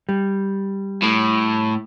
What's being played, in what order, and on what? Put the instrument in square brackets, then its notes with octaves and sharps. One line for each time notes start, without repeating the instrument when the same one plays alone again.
[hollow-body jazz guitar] G3
[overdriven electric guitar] A2